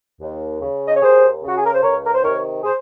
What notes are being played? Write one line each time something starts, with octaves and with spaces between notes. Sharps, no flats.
D#2
C#3
D#5
C#5
D#2 G#4 C5
C#3 F#4
G#4
A#4
C5
C#2 A#4 C#5
A#4
C5
C3 D#3 A#4 C#5
G#4 C5